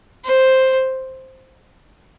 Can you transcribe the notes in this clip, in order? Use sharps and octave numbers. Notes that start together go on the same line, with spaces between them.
C5